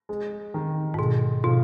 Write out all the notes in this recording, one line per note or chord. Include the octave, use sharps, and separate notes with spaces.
G#3
D#3
G#2
B2 G#3
B2 F3